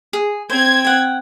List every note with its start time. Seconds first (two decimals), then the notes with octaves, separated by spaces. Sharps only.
0.13 G#4
0.50 C4 C5 G#6
0.85 F#5 G5